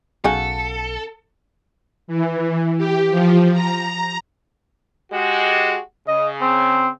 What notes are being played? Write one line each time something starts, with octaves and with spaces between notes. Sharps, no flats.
B1 C#3 F#4 A4 G#5
E3
G4
F3
A#5
G#3 F#4 G4
C#3 D#5
C4